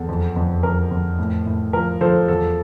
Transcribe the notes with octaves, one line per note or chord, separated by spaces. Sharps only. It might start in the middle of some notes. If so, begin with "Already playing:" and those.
Already playing: E2 A4
F2
F2
F2 A#4
F2
A2
A2
F3 A#4
F3 A4 C5
E2 A4